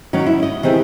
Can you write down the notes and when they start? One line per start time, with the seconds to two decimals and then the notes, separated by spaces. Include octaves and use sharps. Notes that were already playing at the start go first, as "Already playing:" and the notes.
0.13 D#3 F#3 C#4 D#4
0.26 E4
0.43 D#5
0.63 D#3 E3 C4 G4 G#4